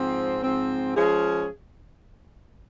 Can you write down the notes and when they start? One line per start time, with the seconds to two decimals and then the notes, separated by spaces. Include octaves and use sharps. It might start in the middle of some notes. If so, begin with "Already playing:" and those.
Already playing: G#2 F3 C4
0.42 G#2 F3 C4
0.96 F3 G#3 C#4 G#4